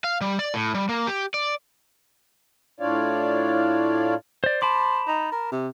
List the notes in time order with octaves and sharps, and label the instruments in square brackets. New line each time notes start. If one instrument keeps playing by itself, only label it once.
[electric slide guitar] F5
G3
D5
A2
G3
A#3
G4
D5
[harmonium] A2 D4 F4 C#5 D5 F5
[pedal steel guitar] C5 D5
[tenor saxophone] C5 [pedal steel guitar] A5 B5 D6
[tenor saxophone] D#4
A#4
C3